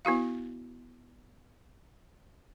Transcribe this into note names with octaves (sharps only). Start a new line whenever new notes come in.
B3 E4 F#4 F5